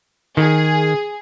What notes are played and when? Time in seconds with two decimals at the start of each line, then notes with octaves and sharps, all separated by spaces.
0.37 D#3 G#4